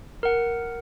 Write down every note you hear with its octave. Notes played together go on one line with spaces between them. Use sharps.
A#4 F#5